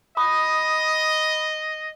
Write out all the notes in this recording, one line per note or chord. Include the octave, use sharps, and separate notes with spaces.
D#5 B5 D#6